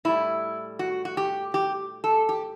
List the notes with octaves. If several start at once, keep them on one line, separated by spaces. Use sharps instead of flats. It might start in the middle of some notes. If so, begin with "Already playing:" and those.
A2 G3 E4
F#4
F#4
G4
G4
A4
G4